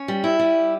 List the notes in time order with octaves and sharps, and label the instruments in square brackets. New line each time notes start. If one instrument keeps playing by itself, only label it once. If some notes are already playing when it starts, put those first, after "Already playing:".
Already playing: [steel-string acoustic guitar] C#4
G3
E4
G3